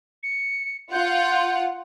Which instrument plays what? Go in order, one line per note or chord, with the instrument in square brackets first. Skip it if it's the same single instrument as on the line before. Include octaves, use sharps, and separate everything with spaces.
[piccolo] C#7
[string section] F4 F#5 [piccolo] G6